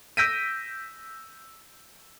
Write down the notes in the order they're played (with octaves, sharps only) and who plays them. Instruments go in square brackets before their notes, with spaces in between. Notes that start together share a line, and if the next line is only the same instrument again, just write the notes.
[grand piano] E6 G6 A#6 B6 D7 D#7